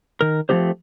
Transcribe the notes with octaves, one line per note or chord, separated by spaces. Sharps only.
D#3 A#4
F3 A3 B3 C4 G4 C5